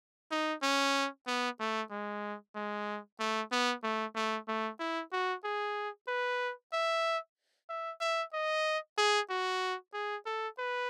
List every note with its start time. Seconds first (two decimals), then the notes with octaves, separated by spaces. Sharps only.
0.31 D#4
0.63 C#4
1.27 B3
1.60 A3
1.91 G#3
2.55 G#3
3.20 A3
3.52 B3
3.83 A3
4.15 A3
4.48 A3
4.80 E4
5.12 F#4
5.44 G#4
6.08 B4
6.73 E5
7.70 E5
8.01 E5
8.33 D#5
8.98 G#4
9.30 F#4
9.94 G#4
10.26 A4
10.58 B4